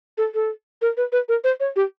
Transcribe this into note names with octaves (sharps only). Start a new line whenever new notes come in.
A4
A4
A#4
B4
B4
A#4
C5
C#5
G4